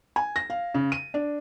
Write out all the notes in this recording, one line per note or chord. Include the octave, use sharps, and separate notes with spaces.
G#5
A#6
F5
C#3
D#7
D4